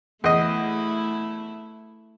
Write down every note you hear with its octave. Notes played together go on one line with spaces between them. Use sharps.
E2 A3 E4 D#5